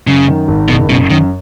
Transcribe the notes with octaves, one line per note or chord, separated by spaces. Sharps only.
F#2 C#3
D#3
G#1
F#1 B2
F#2 B2
F#2 D#3